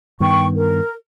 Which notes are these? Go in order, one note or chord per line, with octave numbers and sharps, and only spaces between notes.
G2 D#3 B3 G5 C#6
A#4